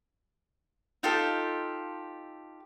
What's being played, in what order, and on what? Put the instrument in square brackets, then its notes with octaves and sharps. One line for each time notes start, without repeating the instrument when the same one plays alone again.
[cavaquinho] D#4 F4 G4 A4